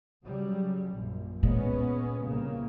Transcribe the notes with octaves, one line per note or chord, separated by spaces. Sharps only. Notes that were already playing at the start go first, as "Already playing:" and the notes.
C#3 F#3 G3
A#1 F#2
A#2 G#3 B3 C#4
C2 C#3 A#3